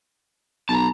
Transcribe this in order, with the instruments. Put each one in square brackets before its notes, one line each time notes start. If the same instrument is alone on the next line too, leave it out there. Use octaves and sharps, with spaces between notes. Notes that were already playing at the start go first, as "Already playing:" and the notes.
[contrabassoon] B1 [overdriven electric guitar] A5 A#5